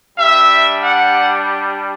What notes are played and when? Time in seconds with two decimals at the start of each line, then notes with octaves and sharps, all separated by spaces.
0.17 G3 D4 G4 E5
0.82 F#5